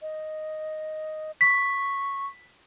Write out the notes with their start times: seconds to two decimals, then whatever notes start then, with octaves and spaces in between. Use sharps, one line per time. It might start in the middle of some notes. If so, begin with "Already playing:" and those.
0.02 D#5
1.41 C#6 B6